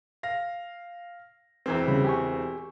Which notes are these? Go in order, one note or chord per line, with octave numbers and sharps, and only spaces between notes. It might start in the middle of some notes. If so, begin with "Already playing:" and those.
F5 A#6
E1 E3 C4
C#3 G3 B5
G4 G#5 C#6